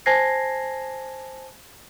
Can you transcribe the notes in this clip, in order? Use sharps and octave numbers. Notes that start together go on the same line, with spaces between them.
C5 G#5 A5 G#6 A#6 C7